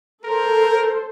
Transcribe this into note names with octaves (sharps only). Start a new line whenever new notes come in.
A4 A#4 C5